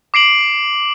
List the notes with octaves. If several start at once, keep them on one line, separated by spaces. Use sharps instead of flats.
D6 C7 D7 F#7